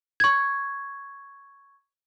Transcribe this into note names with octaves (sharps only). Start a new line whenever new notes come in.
C#6 G#6